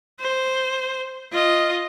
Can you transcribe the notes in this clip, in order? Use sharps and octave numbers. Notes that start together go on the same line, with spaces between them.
C5
F4 D#5